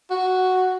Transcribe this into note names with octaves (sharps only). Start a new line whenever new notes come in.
F#4